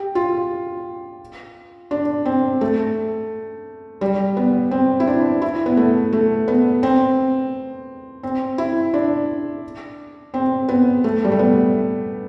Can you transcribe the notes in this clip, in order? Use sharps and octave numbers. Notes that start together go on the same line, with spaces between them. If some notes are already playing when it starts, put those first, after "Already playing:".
Already playing: G4
F4
D4
C4
A3
G3
B3
C4
E4
D4
E4
B3
A3
A3
B3
C4
C4
E4
D4
C4
B3
A3
G3
A3
B3